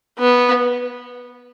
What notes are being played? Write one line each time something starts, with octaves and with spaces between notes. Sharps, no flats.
B3